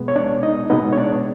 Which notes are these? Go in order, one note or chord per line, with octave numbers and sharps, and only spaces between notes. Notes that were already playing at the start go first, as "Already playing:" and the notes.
Already playing: B2 G#3 B3
C#5
D4 D5
D#4 D#5
B2 G#3 B3 D#4 D#5
C#5
D4 D5